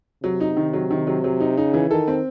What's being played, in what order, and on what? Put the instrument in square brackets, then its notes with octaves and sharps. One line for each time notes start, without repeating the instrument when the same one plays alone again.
[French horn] C3 [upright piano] F#3
[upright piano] D#4
D#3
F#3
D#3
F#3
F#3
D#4
[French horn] C#3 [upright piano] D#4
[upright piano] E3
[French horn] D#3 [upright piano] A4
[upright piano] C4